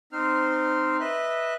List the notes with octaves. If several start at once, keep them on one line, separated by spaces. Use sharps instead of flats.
C4 D#4 C5 F6
B4 D#5 E5 F#6